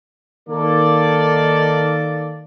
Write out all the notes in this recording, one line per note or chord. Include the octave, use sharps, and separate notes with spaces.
D#3 A#3 A4 D5